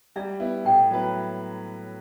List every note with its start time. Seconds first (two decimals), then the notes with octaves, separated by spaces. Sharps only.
0.16 G3 E5
0.40 B3 E4
0.65 A2 G5
0.91 F#3 B3 E4 B4